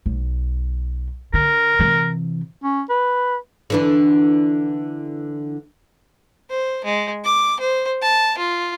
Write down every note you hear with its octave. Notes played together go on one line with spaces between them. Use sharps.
B1
D3 A#4
C3 E3
C#4
B4
D3 E3 D4
C5
G#3
D6
C5
A5
F4